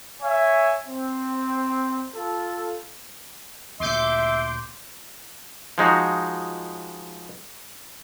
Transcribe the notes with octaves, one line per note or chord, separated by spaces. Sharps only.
C#5 E5 G#5
C4
F4 A4
D2 A#2 E5 C6 D6 G6
F3 G#3 D#4 F#4